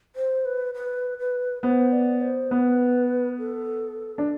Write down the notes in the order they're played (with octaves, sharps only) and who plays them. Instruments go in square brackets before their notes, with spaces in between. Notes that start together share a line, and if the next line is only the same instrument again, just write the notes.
[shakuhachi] C5
B4
B4
B4
[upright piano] B3 [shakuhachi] C5
[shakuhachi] D5
C5
[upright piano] B3 [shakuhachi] B4
[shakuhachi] A4
[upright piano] D4